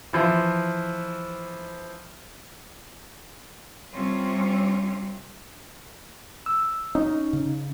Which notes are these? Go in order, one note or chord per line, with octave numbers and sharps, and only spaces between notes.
E3 F3
C3 G3 C4 C#4 F4
E6
C#4 D#4
C#3